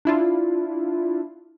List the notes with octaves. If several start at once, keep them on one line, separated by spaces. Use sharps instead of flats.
D4 E4 F4